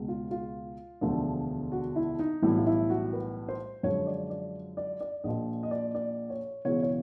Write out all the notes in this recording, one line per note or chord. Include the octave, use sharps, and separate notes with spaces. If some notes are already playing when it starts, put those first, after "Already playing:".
Already playing: C#2 B2 G#3
F4
F4
E1 D2 D3 F3 A3
F#4
E4
D#4
B1 A2 E3 G3 E4
F4
E4
F#4
B4
C5
F#2 D3 F3 G#3 C#5
D5
D5
D5
D5
A#1 A#2 F3 D#5
D#5
D5
D5
C#5
E1 E2 C#3 E3 C#5
C#5